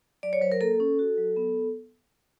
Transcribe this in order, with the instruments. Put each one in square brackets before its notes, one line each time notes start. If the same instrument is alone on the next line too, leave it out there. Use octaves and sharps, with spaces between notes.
[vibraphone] F#3 D5
C#5
F#3 C5
A#4
A#3 A4
C#4
F#4
F#3
B3